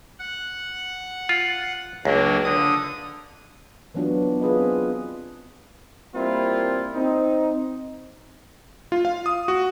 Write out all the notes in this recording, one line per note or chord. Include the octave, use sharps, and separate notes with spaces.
F#5
F4
C#2 F#3 A#3 D4
D3 D#6
E3 F#3 B3 D4 F4 F#4
B3
F4 G#4 B4 D#5
C4
G3 A#3 C4 E4 F4
C4 D#4
F4
F5
D#6
F#4